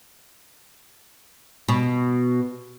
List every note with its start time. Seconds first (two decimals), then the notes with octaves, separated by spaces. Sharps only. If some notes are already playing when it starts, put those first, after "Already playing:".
1.68 B2